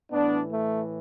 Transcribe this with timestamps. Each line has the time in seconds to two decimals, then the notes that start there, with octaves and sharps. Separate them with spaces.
0.12 A2 E3 B3 D4
0.53 A3